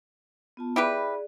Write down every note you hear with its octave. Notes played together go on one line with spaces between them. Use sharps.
B3 F4 A5
E4 G4 G#4 B4 D5